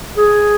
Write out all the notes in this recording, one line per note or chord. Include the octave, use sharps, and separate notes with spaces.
G#4